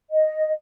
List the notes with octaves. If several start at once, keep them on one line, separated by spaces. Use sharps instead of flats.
D#5